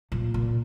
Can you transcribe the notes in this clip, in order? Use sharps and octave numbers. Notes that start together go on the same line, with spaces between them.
A#2
A#2